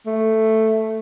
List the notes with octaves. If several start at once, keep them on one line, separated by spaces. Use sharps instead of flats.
A3